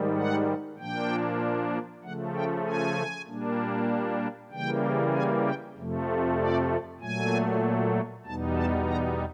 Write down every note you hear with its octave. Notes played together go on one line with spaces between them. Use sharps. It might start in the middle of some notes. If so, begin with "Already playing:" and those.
Already playing: G#2 D#3 G3
F#5
A#2 F3 A#3 D4 G5
C#3 F3 A3 F#5
G5
G#5
A#2 G3 A#3 D4
C#3 E3 G3 A#3 G5
G#5
G5
F2 C3 F3 A3
D5
A#2 F#3 A3 G#5
E2 B2 G3 B3 D#4 A5
A5
A#5